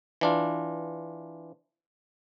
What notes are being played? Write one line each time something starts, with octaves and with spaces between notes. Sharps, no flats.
E3 D4 F4